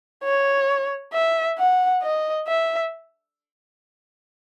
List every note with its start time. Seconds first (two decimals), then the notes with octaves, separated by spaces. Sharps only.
0.24 C#5
1.13 E5
1.58 F#5
2.02 D#5
2.47 E5